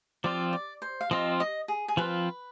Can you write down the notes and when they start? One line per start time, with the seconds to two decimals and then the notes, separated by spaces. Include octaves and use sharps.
0.24 F3 C4 F4 D5
0.53 D5
0.82 C5
1.01 F5
1.11 F3 C4 F4 D#5
1.40 D#5
1.68 G#4
1.88 G#4
1.97 F3 C4 F4 B4